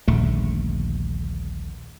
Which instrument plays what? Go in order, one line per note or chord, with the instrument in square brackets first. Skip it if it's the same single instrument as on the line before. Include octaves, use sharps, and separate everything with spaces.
[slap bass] D#1 A#1 D3 A3